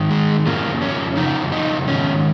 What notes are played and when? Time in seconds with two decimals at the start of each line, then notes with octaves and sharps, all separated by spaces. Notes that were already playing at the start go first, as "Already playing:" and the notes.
Already playing: G#2 D#3
0.11 G#3
0.46 F2 C#3 F3 A#3
0.82 C#4
1.16 F2 C#3 F3 D#4
1.52 D#4
1.88 G#2 D#3 C#4